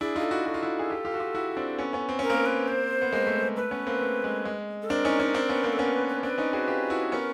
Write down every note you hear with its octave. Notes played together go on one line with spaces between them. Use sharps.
D4 E4 G#4
D#4 F4 G#4
A4
E4 F#4
F#4 A4
F4
E4 F#4
G#4
F4 G4
F4 G4
F#4
F4 G4
E4 F#4
C4 D4
B3 C#4
B3 C#4
C4
C#4 A#4
A#3 C4
B4
C5
B3
G#3 A#3
A3
G#3
A3 B4
B3 C#4
A#3 C4
A3
G#3
G#3
A4
C4 D4 A#4
C#4 D#4
C#4 D#4
C4 D4
B3 C#4
A#3 C4
A4
B3 C#4 A#4
B4
B4
C4 D4 B4
C#4 D#4
F#4 G#4
F4 G4
E4 F#4
B3 C#4 A#4